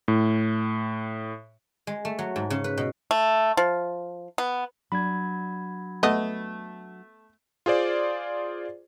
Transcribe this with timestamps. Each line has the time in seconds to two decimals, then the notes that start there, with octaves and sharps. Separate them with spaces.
0.08 A2
1.87 G#3
2.05 A3
2.19 F#3
2.36 G#2
2.50 C#3
2.64 B4
2.77 B2
3.11 A3
3.57 F3
4.38 B3
4.92 F#3 D4 B5 G#6
6.03 A3 B3 D#5 E5
7.66 F4 G#4 C5 D5